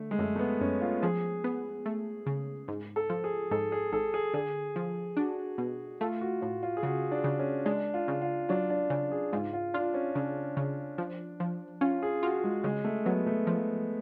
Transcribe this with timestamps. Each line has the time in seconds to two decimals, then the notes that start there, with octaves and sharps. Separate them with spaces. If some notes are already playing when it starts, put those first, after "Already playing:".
Already playing: D3 A3
0.11 G#3
0.19 F#2 A3
0.36 A3
0.39 B3
0.61 F#2 C#4
0.81 F4
1.02 F3 G#4
1.44 B3
1.86 A3
2.26 C#3
2.68 G#2
2.96 A4
3.10 F3
3.24 G#4
3.51 G#2 A4
3.72 G#4
3.92 G#1 A4
4.14 G#4
4.34 D3 G#4
4.76 F3
5.17 D4 F#4
5.58 B2
6.01 A3 F4
6.21 F#4
6.41 A2 F4
6.63 F4
6.77 G#4
6.83 C#3 F#4
7.11 D4
7.24 C#3
7.39 C#4
7.66 G#3 D4
7.94 F4
8.08 C#3
8.22 F4
8.49 F#3 D4
8.70 D4
8.90 C#3
9.12 G#4
9.33 G#2 F4
9.53 F4
9.74 D4 F4
9.94 C#4
10.15 C#3 D4
10.57 C#3
10.98 F3
11.40 F3
11.81 C#4 F4
12.03 G#4
12.23 F4 F#4
12.44 G#3
12.64 C#3 G#3
12.84 A3
13.05 F#3 B3
13.26 A3
13.47 F3